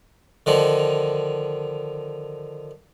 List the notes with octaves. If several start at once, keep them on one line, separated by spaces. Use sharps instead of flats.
D3 D#3 F3